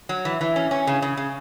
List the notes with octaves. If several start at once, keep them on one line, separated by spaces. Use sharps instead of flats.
F#3
E3
E3
C#4
C#4
C#3
C#3
C#3